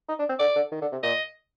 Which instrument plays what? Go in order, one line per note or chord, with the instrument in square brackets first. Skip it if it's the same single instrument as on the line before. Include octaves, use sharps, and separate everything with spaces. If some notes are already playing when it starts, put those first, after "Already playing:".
[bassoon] D#4
D4
C4
[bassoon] D3 [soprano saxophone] D5
[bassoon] D3
D#3
D3
C3
[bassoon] A#2 [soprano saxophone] D#5